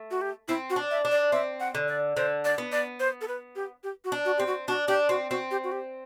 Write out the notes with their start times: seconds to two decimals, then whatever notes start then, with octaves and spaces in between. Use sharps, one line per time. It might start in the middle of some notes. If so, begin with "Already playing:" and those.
Already playing: A3
0.11 F#4
0.21 G4
0.48 C4 E4
0.70 F#4
0.76 D4
0.91 E5
1.05 D4
1.11 D5
1.32 C4 E5
1.60 F#5
1.75 D3
1.88 D5
2.17 D3 C5
2.45 D5
2.58 B3
2.72 D5
3.00 C5
3.21 A4
3.28 B4
3.56 G4
3.83 G4
4.05 F#4
4.12 D4
4.25 F#4
4.38 C4 G4
4.47 F#4
4.68 D4 F#4
4.88 D4 G4
5.09 C4 F#4
5.30 C4 F#4
5.51 G4
5.64 F#4
5.72 G4